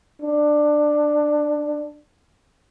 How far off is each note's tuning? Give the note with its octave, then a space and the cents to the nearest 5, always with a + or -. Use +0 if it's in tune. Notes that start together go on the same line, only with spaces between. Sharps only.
D4 +15